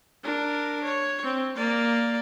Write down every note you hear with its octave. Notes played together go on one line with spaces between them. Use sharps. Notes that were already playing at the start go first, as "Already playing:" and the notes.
D4 A#4
C#5
C4
A#3 D5